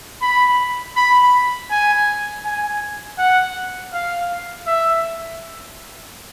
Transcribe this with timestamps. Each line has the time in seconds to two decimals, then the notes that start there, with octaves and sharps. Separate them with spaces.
0.22 B5
0.96 B5
1.71 G#5
2.45 G#5
3.18 F#5
3.93 F5
4.67 E5